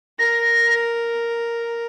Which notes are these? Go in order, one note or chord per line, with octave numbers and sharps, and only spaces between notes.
A#4 A#6